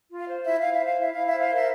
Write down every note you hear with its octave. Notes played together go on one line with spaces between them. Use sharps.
F4
F5
C5
E4 E5
E4 F5
E5
C5
F5
E4 E5
E4 F5
E5
C5
F5
A#4 E5